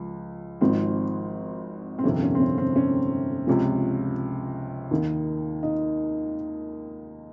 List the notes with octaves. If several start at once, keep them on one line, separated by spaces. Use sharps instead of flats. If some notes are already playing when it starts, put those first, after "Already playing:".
Already playing: C#2 F3
G#1 G#2 F3 C4
C4
G1 F2 C3 D#3 C#4
C#4
C4
C#4
C4
C#4
C#2 C3 F3 C#4
D#2 D#3
D#4